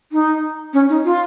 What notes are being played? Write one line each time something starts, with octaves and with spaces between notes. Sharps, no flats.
D#4
C#4
D#4
F4